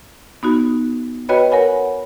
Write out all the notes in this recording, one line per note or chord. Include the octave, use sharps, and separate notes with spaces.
B3 D#4 F#4
F#4 B4 C#5 D#5 G5 B5
A#4 C#5 F#5 G#5 B5